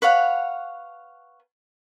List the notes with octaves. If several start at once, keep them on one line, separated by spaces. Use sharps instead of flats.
B4 C#5 F5 F#5